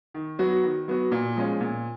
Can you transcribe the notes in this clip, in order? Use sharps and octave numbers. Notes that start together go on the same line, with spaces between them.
D#3
F#3 B3 F#4
D#3
F#3 B3 F#4
A#2
F3 G#3 C#4 F4
A#2